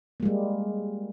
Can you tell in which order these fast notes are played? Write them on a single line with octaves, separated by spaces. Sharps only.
A#3 G#3 G3